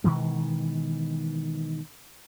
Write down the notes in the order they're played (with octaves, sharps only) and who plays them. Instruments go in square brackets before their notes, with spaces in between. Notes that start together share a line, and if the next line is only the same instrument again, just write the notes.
[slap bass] B2 D#3 E3 G#3